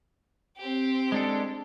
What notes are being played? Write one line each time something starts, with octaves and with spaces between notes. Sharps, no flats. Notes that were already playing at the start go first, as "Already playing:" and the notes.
C4 G4
G#3 D4 A4